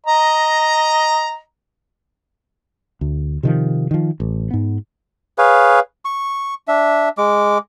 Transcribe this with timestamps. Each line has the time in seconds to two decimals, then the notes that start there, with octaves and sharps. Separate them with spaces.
0.06 D#5 A#5
3.01 D2
3.43 C3 D#3 F3
3.91 D#3 F3
4.20 A1
4.51 G#2 B3
5.38 G#4 B4 C#5 F5
6.05 C#6
6.68 D4 E5
7.18 G#3 D6